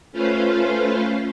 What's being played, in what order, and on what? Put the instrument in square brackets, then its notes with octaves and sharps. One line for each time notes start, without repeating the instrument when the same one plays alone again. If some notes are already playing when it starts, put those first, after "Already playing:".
[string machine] A3 C#4 F4 B4 C5 F5